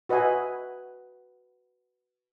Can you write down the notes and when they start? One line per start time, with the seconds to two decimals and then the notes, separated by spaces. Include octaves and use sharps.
0.09 F#4 B4 D#5 E5 G#5